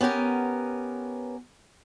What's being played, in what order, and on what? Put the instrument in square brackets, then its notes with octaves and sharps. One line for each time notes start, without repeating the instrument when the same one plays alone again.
[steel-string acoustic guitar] B3 C#4 G4 A#4